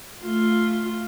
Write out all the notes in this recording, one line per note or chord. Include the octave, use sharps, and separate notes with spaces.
A3 F4